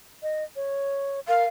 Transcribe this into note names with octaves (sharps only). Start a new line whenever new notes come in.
D#5
C#5
A#4 F5